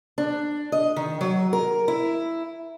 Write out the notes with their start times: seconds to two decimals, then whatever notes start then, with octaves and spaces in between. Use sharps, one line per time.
0.18 D4
0.72 D#5
0.96 D#3
1.21 F#3
1.53 A#4
1.88 E4